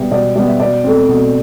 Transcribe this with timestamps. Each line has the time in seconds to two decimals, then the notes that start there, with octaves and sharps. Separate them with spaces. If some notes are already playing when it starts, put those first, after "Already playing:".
Already playing: B2 G3 B3 E5
0.11 B2 D5
0.36 G3 B3 D5
0.48 E5
0.59 B2 D5
0.84 A3 C4
1.08 B2